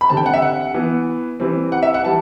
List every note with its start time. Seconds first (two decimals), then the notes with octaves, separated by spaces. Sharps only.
0.01 B5
0.09 D3 G3 C4 A5
0.17 G5
0.26 F#5
0.34 E5
0.42 F#5
0.74 E3 B3
1.40 E3 G3 C4
1.72 F#5
1.83 E5
1.94 F#5
2.04 E3 G3 A5